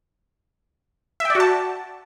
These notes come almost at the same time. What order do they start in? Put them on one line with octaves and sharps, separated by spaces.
E5 G5 D5 F#4 A5